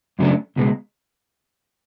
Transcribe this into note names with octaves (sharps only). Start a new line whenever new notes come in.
F#2 C#3 F#3 A3 D4
C#2 B2 G#3